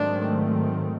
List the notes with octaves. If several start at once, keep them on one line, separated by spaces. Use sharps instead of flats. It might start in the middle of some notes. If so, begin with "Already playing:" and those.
Already playing: G#2 D#3 F#3 A3 C4 D4